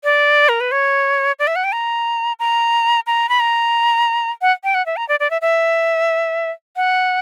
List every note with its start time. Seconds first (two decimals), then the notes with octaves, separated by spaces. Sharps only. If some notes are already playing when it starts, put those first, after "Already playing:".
0.04 D5
0.49 A#4
0.60 B4
0.72 C#5
1.39 D5
1.47 E5
1.56 F#5
1.64 G5
1.72 A#5
2.39 A#5
3.07 A#5
3.29 B5
3.40 A#5
4.42 F#5
4.64 G5
4.74 F#5
4.86 E5
4.97 A#5
5.09 D5
5.20 D5
5.31 E5
5.42 E5
6.76 F#5